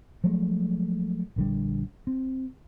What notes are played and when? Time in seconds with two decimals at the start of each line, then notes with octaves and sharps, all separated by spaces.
0.24 F3 F#3 G#3 A3
1.36 A#1 D3 G3
2.07 C4